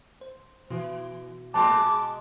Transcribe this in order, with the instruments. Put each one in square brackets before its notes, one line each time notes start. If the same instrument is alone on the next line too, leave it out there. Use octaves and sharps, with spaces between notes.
[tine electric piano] C5
[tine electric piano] B2 F#4 [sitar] E3
[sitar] A2 G#3 C4 [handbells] A5 [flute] D6
[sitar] G#3